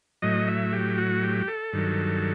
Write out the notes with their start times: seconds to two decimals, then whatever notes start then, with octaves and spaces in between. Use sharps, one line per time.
0.22 A2 F#3 D#5
0.48 E5
0.73 G4
0.98 F#4
1.23 G4
1.48 A4
1.73 G2 D#3 F#3